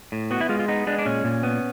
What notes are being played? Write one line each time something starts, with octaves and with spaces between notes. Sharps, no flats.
A2
B3 F#4
E4
G#3 F4
F4
B3 D#4
G#3 D4
D4
A#2 C#4
A#2
B3